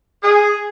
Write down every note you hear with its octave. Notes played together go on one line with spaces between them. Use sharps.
G#4